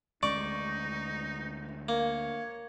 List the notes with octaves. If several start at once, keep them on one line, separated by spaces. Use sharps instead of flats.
D2 G#3 C#4 D#4 D5 C#6
A#3 C#5